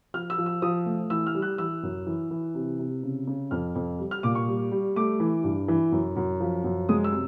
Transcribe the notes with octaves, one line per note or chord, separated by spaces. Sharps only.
F3 F6
E6
F3
E6
F3 D#6
A3
E3 E6
F6
G3
F#6
E3 E6
F#2
E3
E3
C3
C3
C#3
C#3
F2 F6
F2
G3
F6
A#2 D6
C#6
G3
G3
A3 D6
E3
G2
E3
F#2
F#2
F3
F#2
G#3 D#6
E6
C3